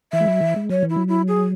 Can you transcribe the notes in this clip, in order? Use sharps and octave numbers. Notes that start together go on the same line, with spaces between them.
E3 E5
G#3
F#3
E3
G#3
F#3 C#5
E3
E4
F#3
E4
G#4